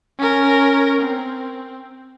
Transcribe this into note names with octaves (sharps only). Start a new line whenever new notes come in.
C#4 A#4
C4